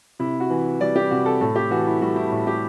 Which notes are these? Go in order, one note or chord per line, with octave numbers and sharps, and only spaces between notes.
C3 E4
F#4
E3
G3 D5
G4
C3 F#4
A4
A2 A4
G4
E3 F#4
E4
G3 F#4
E4
A2
G4